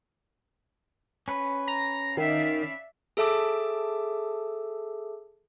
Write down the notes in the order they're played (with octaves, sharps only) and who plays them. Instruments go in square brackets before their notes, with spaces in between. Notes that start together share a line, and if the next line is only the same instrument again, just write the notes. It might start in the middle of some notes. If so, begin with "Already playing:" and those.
[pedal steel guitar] C#4 B4
[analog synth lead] A#5
[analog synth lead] D#3 [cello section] D5 E5 F5
[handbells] G#4 A4 E5 A5 D6 E6